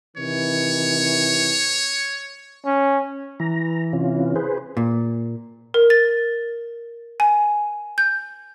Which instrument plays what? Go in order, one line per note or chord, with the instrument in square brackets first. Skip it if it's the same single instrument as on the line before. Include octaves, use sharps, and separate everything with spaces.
[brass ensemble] C3 D#3 E3 [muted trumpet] C#5
[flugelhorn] C#4
[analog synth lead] E3 [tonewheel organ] A#5
[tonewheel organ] C3 C#4 F4
G#4 B4 C5
[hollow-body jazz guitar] A#2
[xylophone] A#4
A6
G#5
G6